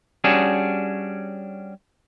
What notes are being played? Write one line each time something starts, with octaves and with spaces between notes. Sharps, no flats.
G3 C#4 D4 F#4 G#4